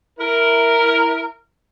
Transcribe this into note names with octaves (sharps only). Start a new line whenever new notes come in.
E4 A#4